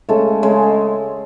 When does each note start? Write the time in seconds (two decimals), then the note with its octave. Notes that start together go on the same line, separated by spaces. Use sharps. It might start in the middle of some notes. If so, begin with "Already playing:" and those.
0.09 C#3 G#3 A3 A4
0.42 C#3 G#3